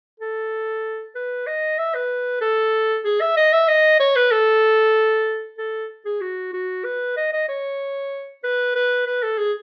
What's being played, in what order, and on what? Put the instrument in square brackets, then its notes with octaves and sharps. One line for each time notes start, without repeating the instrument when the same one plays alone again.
[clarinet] A4
B4
D#5
E5
B4
A4
G#4
E5
D#5
E5
D#5
C#5
B4
A4
A4
G#4
F#4
F#4
B4
D#5
D#5
C#5
B4
B4
B4
A4
G#4